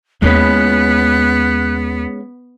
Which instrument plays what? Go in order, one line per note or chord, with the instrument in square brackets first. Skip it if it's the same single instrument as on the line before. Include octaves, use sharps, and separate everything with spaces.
[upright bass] D#2 E4 [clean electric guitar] G#3 C#4 B4 [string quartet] B3 [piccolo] F#6